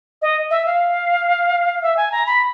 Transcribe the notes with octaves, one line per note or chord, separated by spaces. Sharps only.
D#5
E5
F5
E5
G#5
A#5
B5